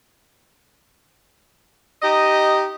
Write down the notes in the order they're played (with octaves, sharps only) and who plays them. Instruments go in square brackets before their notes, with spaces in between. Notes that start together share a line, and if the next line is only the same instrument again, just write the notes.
[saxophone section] D#4 G4 D#5